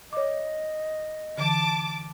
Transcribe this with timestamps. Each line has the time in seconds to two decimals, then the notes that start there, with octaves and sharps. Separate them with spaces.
0.13 C#5 D#5 D6
1.38 D3 E3 A5 D6